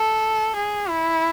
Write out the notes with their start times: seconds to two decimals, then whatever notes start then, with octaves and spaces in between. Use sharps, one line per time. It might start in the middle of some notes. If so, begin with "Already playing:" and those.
Already playing: A4
0.56 G#4
0.89 E4